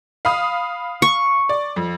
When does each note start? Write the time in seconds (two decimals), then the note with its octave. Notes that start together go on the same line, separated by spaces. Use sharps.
0.25 F5 B5 D#6
1.02 C#6
1.49 D5
1.76 F2